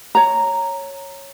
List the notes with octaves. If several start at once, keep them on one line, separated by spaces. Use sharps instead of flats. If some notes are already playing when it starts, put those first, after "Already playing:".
C#5 A#5